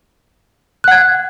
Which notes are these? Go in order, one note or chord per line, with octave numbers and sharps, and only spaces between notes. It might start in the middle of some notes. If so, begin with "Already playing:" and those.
F#5 F#6 G#6